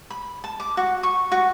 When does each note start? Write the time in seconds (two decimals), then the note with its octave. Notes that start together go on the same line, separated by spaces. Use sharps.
0.10 B5
0.44 A5
0.60 D6
0.77 F#4
1.03 C#6
1.32 F#4